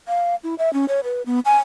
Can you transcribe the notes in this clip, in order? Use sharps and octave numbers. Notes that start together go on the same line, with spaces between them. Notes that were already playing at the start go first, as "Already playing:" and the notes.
F5
E4
E5
C#4
C#5
B4
B3
G#5